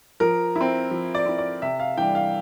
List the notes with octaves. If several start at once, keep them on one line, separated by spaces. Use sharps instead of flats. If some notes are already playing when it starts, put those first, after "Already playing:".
F3 A#4
E4
C4
F3
D5
C4 E4
D5
C3 E5
F5
E3 G3 D4 G5
F5